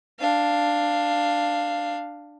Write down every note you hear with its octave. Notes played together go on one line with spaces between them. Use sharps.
D4 F5